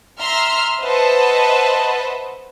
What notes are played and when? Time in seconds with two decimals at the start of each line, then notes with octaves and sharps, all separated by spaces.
0.19 E5 A#5 C6 F6
0.82 B4 C5 D#5 E5 F#5 A5